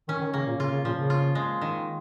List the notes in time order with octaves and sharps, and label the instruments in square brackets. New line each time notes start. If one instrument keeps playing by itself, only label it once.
[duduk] D#3 [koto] C#4
[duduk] D#3
[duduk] C#3 [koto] A#3
[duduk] A#2
[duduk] C#3 [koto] F4
[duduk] C#3
[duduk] A#2 [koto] F3
[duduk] C#3
[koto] F4
G#3
D#3